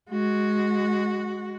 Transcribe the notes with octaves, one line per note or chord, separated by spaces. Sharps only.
G#3 F#4